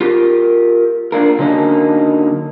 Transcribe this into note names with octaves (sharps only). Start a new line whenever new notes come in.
F4 G4 A#4
A#3 D4 F4 A#4
D3 F#3 A#3 C#4 D#4